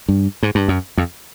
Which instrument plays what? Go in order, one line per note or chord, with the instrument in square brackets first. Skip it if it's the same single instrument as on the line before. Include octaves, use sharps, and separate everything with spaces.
[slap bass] G2
G#2
G2
F#2
F2